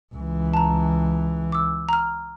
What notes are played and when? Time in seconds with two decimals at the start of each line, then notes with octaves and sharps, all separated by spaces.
0.15 C#2 E3
0.54 A5 A#5
1.52 D6 E6
1.89 A#5 F6